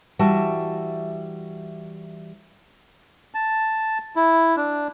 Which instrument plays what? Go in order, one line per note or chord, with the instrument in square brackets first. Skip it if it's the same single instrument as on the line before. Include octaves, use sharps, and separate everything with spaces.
[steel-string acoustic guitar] E3 G3 F#4 E5 A5
[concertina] A5
E4
D4